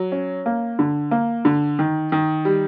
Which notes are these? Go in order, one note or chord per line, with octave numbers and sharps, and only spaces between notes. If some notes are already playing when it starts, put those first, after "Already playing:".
Already playing: F#3
C#4
A#3
D3
A#3
D3
D#3
D#3
G3